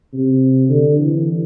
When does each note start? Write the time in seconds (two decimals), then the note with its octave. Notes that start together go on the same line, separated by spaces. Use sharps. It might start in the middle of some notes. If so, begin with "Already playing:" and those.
0.13 C3
0.69 D3
0.98 E3